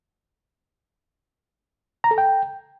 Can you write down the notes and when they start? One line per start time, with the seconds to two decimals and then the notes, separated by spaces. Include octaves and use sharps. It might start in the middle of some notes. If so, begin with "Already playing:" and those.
2.04 A#5
2.11 A4
2.18 G5